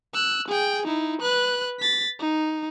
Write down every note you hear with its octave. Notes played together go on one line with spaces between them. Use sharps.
E6 F#6
G#4 G5
D#4 E4
B4 F#6
A6 B6
D#4